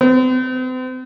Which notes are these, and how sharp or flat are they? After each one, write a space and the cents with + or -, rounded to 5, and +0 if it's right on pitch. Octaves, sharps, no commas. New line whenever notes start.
C4 -40